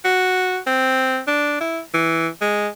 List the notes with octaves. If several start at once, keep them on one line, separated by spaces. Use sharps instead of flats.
F#4
C4
D4
E4
E3
G#3